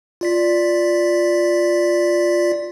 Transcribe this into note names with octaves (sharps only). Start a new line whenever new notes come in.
F4 D5 B6